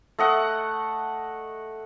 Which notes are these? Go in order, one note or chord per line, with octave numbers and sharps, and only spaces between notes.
A3 D#5 F#5